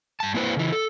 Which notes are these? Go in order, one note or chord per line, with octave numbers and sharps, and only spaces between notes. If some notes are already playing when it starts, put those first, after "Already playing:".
G2 A5
A#3 E4 B4 C5
C#3 E3
A4